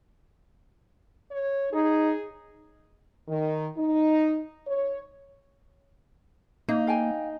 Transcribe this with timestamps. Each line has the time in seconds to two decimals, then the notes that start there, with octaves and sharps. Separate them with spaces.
1.31 C#5
1.73 D#4 G#4
3.28 D#3
3.77 D#4
4.67 C#5
6.69 A#3 D#4
6.87 F5 G5 G#5